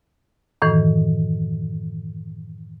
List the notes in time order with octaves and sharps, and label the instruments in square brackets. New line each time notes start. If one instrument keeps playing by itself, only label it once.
[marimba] F#2 A2 D#3 E3